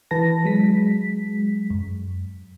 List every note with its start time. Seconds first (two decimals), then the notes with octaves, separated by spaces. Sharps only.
0.11 E3 B4 A5 A#6
0.44 F#3 G#3 B6
1.70 F#2